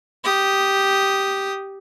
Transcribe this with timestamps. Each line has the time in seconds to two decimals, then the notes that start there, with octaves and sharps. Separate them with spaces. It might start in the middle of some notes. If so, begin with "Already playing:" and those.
0.24 G4 D#6